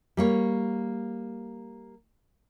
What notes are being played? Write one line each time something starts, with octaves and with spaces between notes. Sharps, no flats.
G3 A#3 C#5